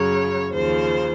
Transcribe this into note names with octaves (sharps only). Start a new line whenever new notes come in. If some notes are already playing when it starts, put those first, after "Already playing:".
Already playing: F#2 C#3 F#3 C#5
D#2 C#3 F3 C5